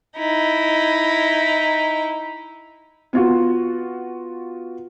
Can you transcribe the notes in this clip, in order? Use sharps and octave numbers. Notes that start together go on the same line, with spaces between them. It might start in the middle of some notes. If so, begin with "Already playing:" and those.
D#4 E4
B3 F4 F#4